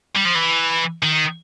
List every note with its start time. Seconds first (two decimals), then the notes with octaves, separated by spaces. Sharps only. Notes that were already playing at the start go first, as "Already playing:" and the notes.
0.16 G3
0.25 F3
0.35 E3
1.03 D#3